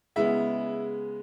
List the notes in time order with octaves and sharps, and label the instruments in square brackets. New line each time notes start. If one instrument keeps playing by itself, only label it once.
[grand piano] C#3 G#3 B3 E4 E5